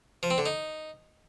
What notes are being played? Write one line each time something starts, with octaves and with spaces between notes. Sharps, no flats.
F3
C4
D3
D#4